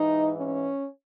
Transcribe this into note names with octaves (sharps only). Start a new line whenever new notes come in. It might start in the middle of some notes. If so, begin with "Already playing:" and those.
Already playing: G#2 E3 D#4
C#4